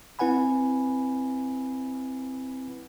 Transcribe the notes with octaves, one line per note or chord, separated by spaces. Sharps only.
C4 E4 B4 F#5 G#5 B5